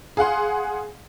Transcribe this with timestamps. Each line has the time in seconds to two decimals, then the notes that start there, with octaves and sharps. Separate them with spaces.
0.17 G#4 F5 F#5 C6